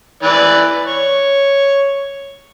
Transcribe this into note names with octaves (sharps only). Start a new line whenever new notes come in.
E3 B4 D5
C#5